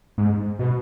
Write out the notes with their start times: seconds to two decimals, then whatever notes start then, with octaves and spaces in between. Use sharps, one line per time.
0.18 G#2
0.59 B2